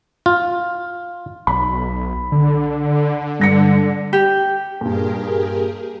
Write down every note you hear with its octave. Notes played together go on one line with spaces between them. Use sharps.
F4
B1 B5
D3
G2 A#6 C#7
G4
G2 A#2 G4 G#4 A#4